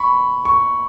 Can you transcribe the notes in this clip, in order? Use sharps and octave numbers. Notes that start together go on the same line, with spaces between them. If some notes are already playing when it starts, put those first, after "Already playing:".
Already playing: B5 C#6
C#6